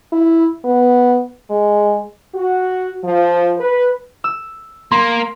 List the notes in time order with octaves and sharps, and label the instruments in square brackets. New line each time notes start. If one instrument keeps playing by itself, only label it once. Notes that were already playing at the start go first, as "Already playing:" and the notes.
[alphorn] E4
B3
G#3
[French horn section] F#4
F3
B4
[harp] E6
[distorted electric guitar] A#3 [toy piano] C6 [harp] B6